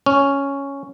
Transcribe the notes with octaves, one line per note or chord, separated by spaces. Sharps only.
C#4